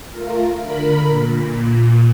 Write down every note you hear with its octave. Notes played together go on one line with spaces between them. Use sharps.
A3 F4 A#4
D3 A#4 B5
A#2